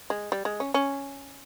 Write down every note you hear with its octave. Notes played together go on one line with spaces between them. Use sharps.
G#3
G3
G#3
C#4
C#4